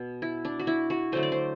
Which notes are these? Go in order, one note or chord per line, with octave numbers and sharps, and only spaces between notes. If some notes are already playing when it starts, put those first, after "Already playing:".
Already playing: B2 B3
E4
D4
F#4
E4
F#4
D3 F#3 A3 C5
D5
C5